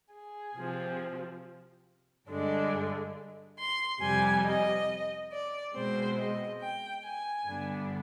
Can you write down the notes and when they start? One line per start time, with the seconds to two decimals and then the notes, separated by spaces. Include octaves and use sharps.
0.13 G#4
0.56 C3 F3 C4
2.29 G2 D3 G#3 D4
3.58 C6
4.01 F2 C3 G3 G#5
4.45 D#5
5.32 D5
5.74 B2 G#3 C4 C5
6.18 D#5
6.61 G5
7.04 G#5
7.46 G2 D3 G3 B3 D4